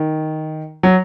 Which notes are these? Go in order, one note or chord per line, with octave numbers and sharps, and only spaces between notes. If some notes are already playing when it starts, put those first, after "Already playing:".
Already playing: D#3
F#3